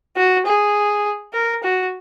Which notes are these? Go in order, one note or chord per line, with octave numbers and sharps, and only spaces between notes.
F#4
G#4
A#4
F#4